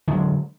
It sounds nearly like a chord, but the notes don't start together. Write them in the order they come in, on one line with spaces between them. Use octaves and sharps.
D3 F#3 G#3